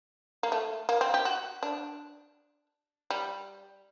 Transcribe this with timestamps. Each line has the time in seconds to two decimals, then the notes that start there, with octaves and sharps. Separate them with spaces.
0.43 A#3
0.52 A3
0.89 A#3
1.01 C4
1.14 G4
1.25 F#4
1.63 D4
3.10 G3